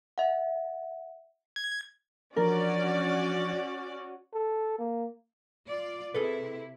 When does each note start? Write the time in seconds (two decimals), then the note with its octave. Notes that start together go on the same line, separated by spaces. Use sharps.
0.18 E5 F#5
1.56 G#6
2.36 E3 F3 C#4 D4 F#4 A#4 D5
4.34 A4
4.79 A#3
5.68 F4 D5
6.14 C3 E4 G#4 A4 B4